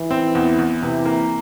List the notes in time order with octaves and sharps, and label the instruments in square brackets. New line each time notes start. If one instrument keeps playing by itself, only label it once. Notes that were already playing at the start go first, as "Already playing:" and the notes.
Already playing: [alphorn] E3
[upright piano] C4
E2
E2
[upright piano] C3 [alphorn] E3
[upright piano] A#3